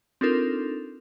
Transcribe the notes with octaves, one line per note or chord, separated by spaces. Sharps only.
C4 D4 D#4 F4 A4 A#4